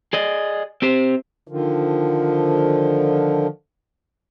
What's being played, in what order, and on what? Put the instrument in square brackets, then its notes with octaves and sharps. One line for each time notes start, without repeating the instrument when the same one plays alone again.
[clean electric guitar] G#4 D5 D#5
C4 G4 C5
[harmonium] D3 D#3 F3